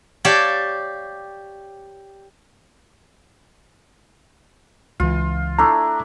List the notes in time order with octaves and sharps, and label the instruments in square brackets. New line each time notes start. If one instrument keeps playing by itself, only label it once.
[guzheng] G4 C#5 D5 F5 A5
[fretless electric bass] C#2 E3 [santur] F4
[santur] A3 D4 E4 [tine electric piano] A#5